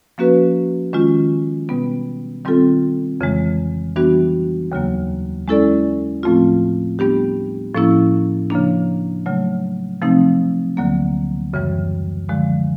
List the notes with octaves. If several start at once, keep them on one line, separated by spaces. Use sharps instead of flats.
F3 A#3 C#4 F#4 B4
D#3 G#3 C#4 F4
B2 G3 B3
D#3 G3 C4 F4 A4
F2 C#3 E3 G#3
E3 G3 B3 D4 F#4
D#2 C#3 F#3 A#3
G#3 C#4 E4 A4 D5
A2 F3 A3 C4 F4
G3 B3 D4 G4
A2 F3 A#3 C#4 E4
C#3 F3 A#3 D4
C#3 F#3 A3
C3 F3 A3 C4 D#4
D2 D3 F#3 A#3
F#2 C#3 E3 G3
D3 F3 G#3